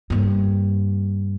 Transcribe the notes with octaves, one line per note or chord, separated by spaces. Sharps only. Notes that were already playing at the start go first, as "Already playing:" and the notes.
G2 A#3